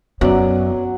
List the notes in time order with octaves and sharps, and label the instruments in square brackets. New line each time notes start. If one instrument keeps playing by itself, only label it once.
[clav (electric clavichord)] F#2 D5 [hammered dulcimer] F#3 [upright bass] B3 [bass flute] C#5